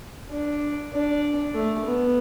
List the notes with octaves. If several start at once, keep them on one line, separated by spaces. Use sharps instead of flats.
D4
D4
A3
B3